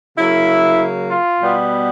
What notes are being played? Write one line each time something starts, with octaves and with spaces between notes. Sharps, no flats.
C#3 F#3 A#3 E4
F4
B2 G3 B3